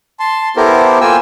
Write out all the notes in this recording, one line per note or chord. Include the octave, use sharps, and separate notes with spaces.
A5 C6
B3 E4 G4 A4 A#4 C5
A#3 F4 G5 G#5 E6